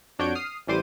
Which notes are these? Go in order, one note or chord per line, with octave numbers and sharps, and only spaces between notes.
F2 D4 F#4 C#5 G6 D7
D#6 F6 C7
A1 E3 G3 C5 D6 D#7